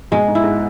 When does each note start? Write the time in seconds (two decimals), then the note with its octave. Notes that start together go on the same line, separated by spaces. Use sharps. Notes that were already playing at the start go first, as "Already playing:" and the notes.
0.12 G#2 B2 G#3
0.28 G#2
0.35 E4
0.44 G#2